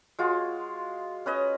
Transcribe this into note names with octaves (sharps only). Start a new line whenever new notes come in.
G#3 F4 F#4
C#4 B4 D#5